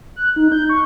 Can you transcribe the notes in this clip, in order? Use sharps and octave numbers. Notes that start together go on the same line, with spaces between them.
F#6
D#4
G6
C#6